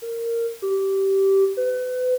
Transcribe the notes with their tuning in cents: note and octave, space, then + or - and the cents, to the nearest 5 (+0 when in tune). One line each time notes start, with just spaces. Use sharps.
A#4 -10
G4 -15
B4 +35